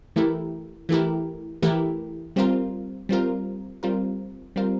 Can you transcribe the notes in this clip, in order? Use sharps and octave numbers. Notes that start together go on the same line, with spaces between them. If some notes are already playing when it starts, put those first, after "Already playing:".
E3 A3 E4 G4 A#4
E3 A3 E4 G4 A#4
E3 A3 E4 G4 A#4
G3 C4 F4 A#4
G3 C4 F4 A#4
G3 C4 F4 A#4
G3 C4 F4 A#4